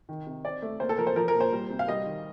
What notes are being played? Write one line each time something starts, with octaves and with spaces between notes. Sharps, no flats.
D#3
C3
C4 D5
A3
A#3 C5
A4
F3 A#4
C5
F3 A#4
A#4
A#2
C5
G3
C3
F5
G3 D#5
D#3